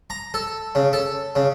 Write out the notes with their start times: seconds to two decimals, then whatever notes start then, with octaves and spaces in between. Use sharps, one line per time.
0.10 A#5
0.34 A4
0.75 C#3
0.93 A4
1.36 C#3